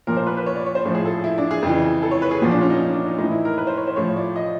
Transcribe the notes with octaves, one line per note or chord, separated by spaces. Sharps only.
A#2 F3 A#4
C5
B4
B4
C#5
D5
C#5
C5
A2 F3
G#4
A4
E4
D4
G#4
F2 C#3 E3
A4
C#5
B4
G#4
A#2 F3 F#4
D4
C#4
D#4
D#4
D4
D#4
A2 E3 D#4
E4
A#4
B4
C5
C#5
C5
A2 F3 C#5
D5
D#5